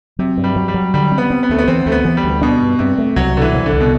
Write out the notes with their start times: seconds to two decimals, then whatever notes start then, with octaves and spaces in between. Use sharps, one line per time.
0.19 C3 F#3
0.37 G2
0.44 G3
0.56 F#3
0.68 G3
0.74 F#3
0.94 D3 G3
1.12 C4
1.18 B3
1.30 C4
1.43 B3
1.49 D2 A3
1.59 B3
1.68 E3 C4
1.86 D2 A3
1.92 B3
2.05 E3
2.17 G3
2.24 D2
2.42 B2 D4
2.60 G2
2.79 G2 C3
2.98 A3
3.16 C2 F#3
3.36 B2 D3
3.41 E3
3.54 C2
3.66 D3
3.73 C2
3.80 B2